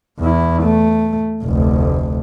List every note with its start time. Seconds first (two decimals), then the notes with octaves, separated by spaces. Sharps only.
0.20 E2 E4
0.63 A3
1.44 F1 D2